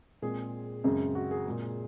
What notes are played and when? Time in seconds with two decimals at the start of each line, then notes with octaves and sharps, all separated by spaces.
0.22 A#2 G#3 C4 G#4
0.84 F#2 C#3 G#3 C4
1.15 F#4
1.31 G#4
1.46 A#2 G#3 C4